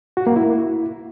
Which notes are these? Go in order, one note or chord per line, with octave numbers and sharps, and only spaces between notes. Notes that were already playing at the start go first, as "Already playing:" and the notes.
F#4
A#3
E4